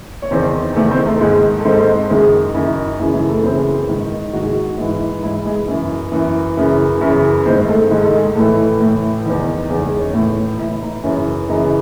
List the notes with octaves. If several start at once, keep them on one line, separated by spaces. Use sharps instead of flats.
C#5
E2 D#3 C4 C5
E2 D#3 A3 A4
C4 C5
A3 A4
G#2 D#3 G#3 G#4
A4
G#2 D#3 C4 C5
A4
C4 C5
F#2 D#3 G#3 G#4
F#2 D#3 E4
F#2 C#3 E3 E4
G#3 G#4
A3 A4
F#2 C#3 E3 C4 C5
G#2 D#3
G#2 D#3 F#4
G#4
F#4
G#2 E3
G#2 E3 E4
G#3 G#4
F#2 E3
F#2 E3
F#2 C#3 E3
F#2 C#3 E3
G#2 D#3 C4 C5
A3 A4
G#2 D#3 G#4
A4
G#3 G#4
A2 E3 A3 A4
A2 E3
E2 D#3
E2 D#3 G#3 G#4
G#3 G#4
C#4 C#5
A2 E3
A2 E3 E4 E5
D#4 D#5
F#2 C#3 E3 C#4 C#5
F#2 C#3 E3 D#4 D#5